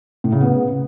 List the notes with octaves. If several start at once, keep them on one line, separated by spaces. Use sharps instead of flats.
A2
C#3
B3